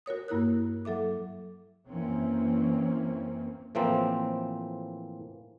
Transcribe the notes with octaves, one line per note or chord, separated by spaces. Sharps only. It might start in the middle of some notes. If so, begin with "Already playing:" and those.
F#4 A#4 C#5 D#6
G2 A#3 E4 A#4 F#6
F#3 A4 E5 D6
F#2 E3 A#3 C4 C#4
A2 E3 F3 A#3 C4